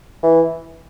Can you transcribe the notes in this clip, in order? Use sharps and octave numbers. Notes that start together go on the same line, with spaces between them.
E3